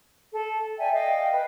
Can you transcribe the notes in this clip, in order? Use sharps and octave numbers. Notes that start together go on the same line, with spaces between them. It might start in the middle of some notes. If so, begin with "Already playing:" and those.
A4
D5 E5 G5 G#5
D#5 F5 G5
B4